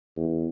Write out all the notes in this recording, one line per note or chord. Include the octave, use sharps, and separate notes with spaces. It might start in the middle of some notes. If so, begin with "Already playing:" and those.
E2